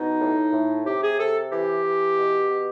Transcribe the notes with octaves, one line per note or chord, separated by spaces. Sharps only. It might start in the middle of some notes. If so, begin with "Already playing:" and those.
Already playing: B2 D#4
A2
A2
C3 G4
G#4
C3 A4
E3 G4
E3
B2
B2